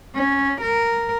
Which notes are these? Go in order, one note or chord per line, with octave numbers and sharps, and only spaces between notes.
C#4
A#4